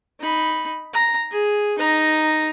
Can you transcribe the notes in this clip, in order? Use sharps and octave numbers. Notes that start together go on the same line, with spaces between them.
D#4 B5
A#5
G#4
D#4 A#5